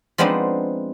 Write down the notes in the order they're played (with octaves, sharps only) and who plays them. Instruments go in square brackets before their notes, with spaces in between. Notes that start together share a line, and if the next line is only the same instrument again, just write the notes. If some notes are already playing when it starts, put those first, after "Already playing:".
[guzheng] F3 G#3 B3 C4 D4 D#4